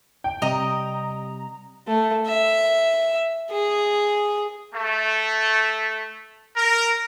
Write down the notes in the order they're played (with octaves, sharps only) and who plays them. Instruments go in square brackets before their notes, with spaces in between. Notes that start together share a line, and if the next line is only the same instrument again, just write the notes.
[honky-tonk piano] G5
[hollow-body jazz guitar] C3 G3 [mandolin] D#5 [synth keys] A#5
[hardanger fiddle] A3
E5
G#4
[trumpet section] A3
A#4